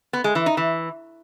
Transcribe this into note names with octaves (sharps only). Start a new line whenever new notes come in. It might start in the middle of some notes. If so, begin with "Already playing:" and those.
B3
G#3
E3
D#4
E3